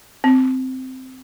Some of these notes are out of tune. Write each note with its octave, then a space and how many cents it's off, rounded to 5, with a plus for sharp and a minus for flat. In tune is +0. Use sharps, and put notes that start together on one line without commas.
C4 -10